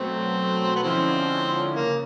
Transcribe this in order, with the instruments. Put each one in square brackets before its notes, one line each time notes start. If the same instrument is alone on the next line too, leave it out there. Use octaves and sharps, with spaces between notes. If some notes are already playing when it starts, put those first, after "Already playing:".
Already playing: [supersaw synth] B2 F#3 A3 [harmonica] C4
[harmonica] B3
[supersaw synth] D3 F3 G#3 C#4 E4 [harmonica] C4
[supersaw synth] C#3 [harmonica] A#3